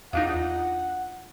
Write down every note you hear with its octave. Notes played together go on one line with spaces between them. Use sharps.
E2 D4 D#4 F4 F5 F#5